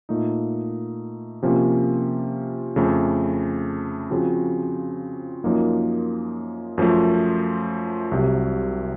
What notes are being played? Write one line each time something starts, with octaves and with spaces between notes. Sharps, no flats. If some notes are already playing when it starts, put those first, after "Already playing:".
A#2 A3 D#4
C3 F3 A#3 C#4
F2 C#3 A3
C#3 F3 C4 F#4
F#2 F3 A#3 D#4
F#2 F3 A3
C2 C3 F#3